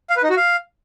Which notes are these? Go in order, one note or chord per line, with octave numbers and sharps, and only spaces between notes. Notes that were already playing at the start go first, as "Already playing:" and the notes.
F5
B4
D#4
F#4
F5